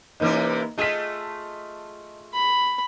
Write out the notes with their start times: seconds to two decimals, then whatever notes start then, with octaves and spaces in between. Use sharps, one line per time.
0.20 C3 E3 A#3 C#4 D#4
0.78 A3 F4 G#4 D#5 B6
2.33 B5